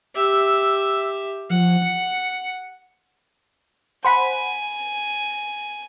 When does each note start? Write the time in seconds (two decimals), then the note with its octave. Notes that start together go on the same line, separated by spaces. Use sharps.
0.15 G4 E5 E6
1.50 F3 F#5
1.82 C#7
4.04 C5 F#5 G#5 B5